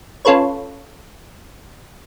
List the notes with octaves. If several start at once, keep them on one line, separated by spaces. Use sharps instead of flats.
C#4 F4 A4 B4 C#5